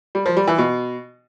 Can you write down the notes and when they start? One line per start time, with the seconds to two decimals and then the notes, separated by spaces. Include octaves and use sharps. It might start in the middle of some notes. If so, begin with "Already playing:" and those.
0.15 G3
0.26 F3
0.37 G3
0.47 E3
0.58 B2